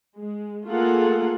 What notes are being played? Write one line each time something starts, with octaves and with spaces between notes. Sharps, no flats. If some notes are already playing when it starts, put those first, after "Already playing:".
G#3
A3 A#3 F4 G#4 A4 F#5